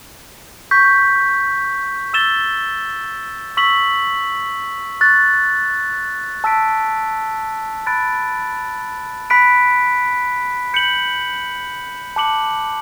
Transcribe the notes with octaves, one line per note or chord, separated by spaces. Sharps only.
C#6 G6 B6
E6 A6 E7 G7
C#6 E6 B6 F#7
C#6 F#6 A6
A5 E6 B6 D7
B5 F#6 A6 D7
B5 F#6 B6 D7
G6 C#7 F#7
A5 D6 F#6 C#7 F#7